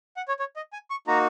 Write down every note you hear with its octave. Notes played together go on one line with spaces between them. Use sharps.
F#5
C#5
C#5
D#5
G#5
C#6
A#3 D#4 F#4 A#5